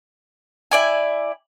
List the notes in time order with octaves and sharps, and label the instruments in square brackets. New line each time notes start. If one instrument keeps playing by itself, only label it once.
[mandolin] E4 D5 G#5